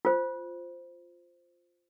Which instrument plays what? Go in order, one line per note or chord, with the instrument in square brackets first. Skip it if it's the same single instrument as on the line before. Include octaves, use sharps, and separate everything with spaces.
[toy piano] F4 C5